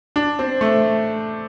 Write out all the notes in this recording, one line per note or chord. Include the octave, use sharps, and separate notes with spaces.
D4
C4
A3